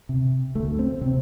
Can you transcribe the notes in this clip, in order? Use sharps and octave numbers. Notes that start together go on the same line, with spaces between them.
C3
D2 A3
C4
C3 C4